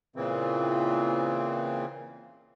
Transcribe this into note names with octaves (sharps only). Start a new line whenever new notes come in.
A#2 C#3 E3 C4